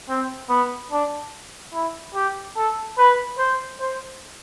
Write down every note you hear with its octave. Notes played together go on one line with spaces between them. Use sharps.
C4
B3
D4
E4
G4
A4
B4
C5
C5